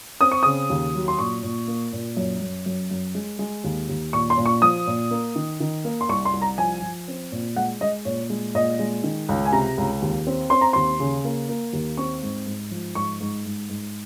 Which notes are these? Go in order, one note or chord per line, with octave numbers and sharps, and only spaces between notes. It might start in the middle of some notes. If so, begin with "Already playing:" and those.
C4 D#6
C#6
C#3 D#6
D#2
F#3
C6
A#2 C#6
A#2
A#3
A#2
F#2
F#2
F#2
F#2
G#3
G#3
D#2
D#2
A#2 C#6
C6
A#2
C#6
F3 D#6
A#2
A#3
D#3
D#3
A#3
C6
C2 C#6
C6
C2
A#5
F3 G#5
F3
C4
A#2
G#3 F#5
G#3 D#5
A#2 C#5
G#3
A#2 D#5
G#3
D#3
C#2
G#5
C3 A#5
C#2
D#2
C4
C4 C6
A#5
D#2 C6
C#3
A#3
A#3
D#2
C4 C#6
G#2
G#2
F3
G#2 C#6
G#2
G#2
G#2